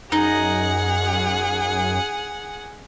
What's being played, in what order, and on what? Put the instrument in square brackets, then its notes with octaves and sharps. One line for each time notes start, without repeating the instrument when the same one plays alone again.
[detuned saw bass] F#2 [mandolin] D#4 [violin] G#4 F#5